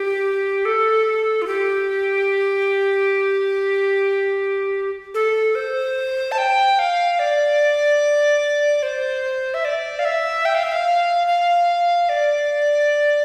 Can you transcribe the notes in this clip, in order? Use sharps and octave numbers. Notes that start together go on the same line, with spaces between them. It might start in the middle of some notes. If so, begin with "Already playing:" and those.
Already playing: G4
A4
F4
G4
A4
C5
A5
G5
F5
D5
C5
E5
D5
F5
E5
G5
F5
E5
F5
F5
D5